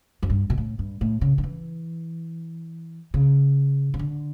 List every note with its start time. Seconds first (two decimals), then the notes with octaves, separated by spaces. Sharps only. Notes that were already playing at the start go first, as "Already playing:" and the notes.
0.23 F#2
0.30 G2
0.50 B2
0.58 A2
0.79 G2
1.01 A2
1.21 C#3
1.38 D3
1.44 E3
3.14 C#3
3.94 C#3
3.99 D3